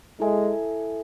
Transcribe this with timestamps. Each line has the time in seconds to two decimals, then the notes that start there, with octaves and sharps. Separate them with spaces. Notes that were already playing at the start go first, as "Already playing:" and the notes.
0.20 G#3 E4 A4 E5 G#5